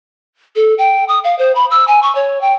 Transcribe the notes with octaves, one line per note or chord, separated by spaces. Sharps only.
A4
G5
D#6
F5
C5
B5
E6
G#5
C#6
C#5
G5